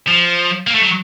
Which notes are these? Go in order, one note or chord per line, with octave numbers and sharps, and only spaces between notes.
F3
A#3
A3
F#3